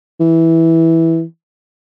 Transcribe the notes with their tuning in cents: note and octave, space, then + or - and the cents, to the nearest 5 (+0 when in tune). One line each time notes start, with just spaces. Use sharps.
E3 -10